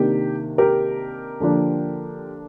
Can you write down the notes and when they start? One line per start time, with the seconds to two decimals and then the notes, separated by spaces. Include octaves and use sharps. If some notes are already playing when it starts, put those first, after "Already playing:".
Already playing: C3 D#3 A#3 D4 G4
0.58 G4 A#4
1.40 D3 F3 A#3 D4